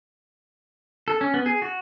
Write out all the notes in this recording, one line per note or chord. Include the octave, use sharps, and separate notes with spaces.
A4
C#4
B3
G#4
F#4